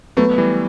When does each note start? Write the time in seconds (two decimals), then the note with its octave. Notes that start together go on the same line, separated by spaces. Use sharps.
0.17 F#3 A3 B3
0.38 E3 G3